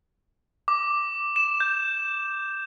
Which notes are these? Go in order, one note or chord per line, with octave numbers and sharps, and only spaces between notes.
D6
E7
G6